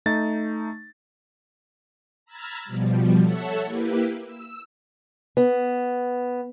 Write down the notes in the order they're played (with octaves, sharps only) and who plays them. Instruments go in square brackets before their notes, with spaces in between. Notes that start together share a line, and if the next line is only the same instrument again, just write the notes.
[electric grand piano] A3 D#4 A6
[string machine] A#5 B5 E6 F6 G#6 A6
B2 F3 G3
A4 C#5 E5 F#5 A5
A#3 E4 G4 B4
E6
[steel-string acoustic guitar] B3